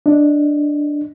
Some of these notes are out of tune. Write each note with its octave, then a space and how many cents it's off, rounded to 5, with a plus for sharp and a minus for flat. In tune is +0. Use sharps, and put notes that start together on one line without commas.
D4 +0 D#5 +0